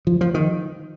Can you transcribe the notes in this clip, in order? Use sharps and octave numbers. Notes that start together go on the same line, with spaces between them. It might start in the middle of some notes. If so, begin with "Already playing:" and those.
F3
F3
D#3